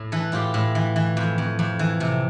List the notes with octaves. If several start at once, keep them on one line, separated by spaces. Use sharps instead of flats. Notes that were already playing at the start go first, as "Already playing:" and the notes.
Already playing: A2
E3 A4 B4
A2 F4 G4
A2
E3
E3
F2
F2
F2
E3
C3